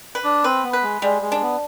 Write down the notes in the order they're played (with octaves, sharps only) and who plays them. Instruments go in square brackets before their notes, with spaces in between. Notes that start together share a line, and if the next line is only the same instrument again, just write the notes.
[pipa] B4
[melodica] D4
[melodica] C4 [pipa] B4
[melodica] B3
[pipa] B4
[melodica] G#3
[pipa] G3 [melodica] G#3
[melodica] G#3
[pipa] D4
[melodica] B3